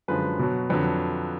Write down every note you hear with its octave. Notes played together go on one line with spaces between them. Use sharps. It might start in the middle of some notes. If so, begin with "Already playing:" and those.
F#2 D3 F3 G#3 B4
B2 F#3
F2 D3 F#3 B4